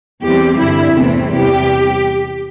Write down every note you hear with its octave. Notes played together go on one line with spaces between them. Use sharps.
E2 E3 G3 C4 G4
G2 D3 G3 E4
E2 C3 E3 A3 C4
E2 C3 G3 G4